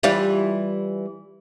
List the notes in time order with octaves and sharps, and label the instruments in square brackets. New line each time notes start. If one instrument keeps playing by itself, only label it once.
[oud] E3 G3 F4